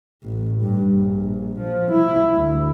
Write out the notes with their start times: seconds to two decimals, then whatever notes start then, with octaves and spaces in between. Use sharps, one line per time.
0.24 A1
0.62 G2
0.93 A#1
1.60 F3
1.92 E4
2.35 D2